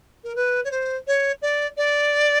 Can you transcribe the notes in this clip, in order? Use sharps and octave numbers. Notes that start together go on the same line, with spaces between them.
A#4
B4
C#5
C5
C#5
D5
D5